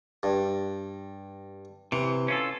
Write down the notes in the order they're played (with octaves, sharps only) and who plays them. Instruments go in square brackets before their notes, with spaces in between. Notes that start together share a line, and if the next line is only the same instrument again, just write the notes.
[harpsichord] G2
[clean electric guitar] C3 [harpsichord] E3
[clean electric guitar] C#4 F4 A4